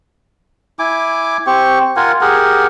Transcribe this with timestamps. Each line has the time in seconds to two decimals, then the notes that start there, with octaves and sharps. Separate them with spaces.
0.79 E4 G#5 D6
1.47 C4 G4 C#6
1.97 F4 A#4 F#5 G#5
2.21 G4 G#4 A#4 F#5